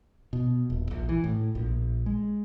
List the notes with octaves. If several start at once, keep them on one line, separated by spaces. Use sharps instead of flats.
B2
D#1
A#1
E3
A2
A#1
G#3